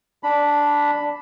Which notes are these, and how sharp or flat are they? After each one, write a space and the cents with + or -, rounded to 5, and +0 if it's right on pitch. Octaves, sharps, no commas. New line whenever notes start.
D4 -5 B5 +0